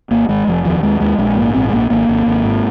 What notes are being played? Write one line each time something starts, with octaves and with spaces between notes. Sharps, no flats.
G#1 A#3
G#1 G#3
F1 F3
D#2 F3
D#2 G#3
D#2 G#3
A#1 G#3
G#2 A#3
A#1 C4
G#3
A#1 A#3
G#1 A#3
G#1
G#1
G#2